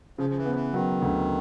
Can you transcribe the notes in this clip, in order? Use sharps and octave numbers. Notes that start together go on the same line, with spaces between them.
C#3 F3
F3
E3
F3 B3
E3
D#3 F#3
D2